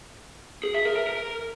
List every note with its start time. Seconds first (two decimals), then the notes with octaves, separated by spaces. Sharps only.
0.63 G#4
0.74 E5
0.85 A#4
0.96 A#4
1.07 A#4